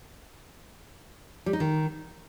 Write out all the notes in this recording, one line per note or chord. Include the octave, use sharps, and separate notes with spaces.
G3
D#4
D#3